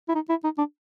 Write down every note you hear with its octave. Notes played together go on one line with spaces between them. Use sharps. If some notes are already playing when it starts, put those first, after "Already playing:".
E4
D#4
E4
D#4
D4